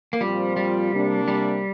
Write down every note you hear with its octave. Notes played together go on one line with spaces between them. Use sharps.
A#3
A#2 F3 G3 C4 F4
G3
C3 A#3 D4
G3